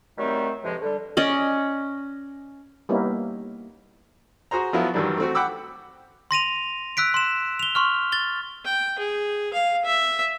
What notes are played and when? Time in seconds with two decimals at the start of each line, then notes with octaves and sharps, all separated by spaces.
0.18 D#3 F#3 G3 A3 C4 D#4
0.63 E2 A2 C3 F3 G#3
0.81 D3 G3
1.17 C#4 D5 D#5
2.89 G3 A#3 B3 C#4 D#4 E4
4.51 F#4 G#4 C5 A#5
4.73 F3 F#3 B3 E4 F4
4.94 G2 D#3 E3 F#3 G3 D4
5.18 A3 C4 F#4
5.35 F#5 G5 B5 D6 E6
6.31 C6 A#6 D#7 F7
6.97 E6 F#6 B6 D7
7.14 C6 E7
7.59 F7 G7
7.75 C6 C#6 F6
8.12 A6 G7
8.65 G5
8.99 G#4
9.53 F5
9.85 E5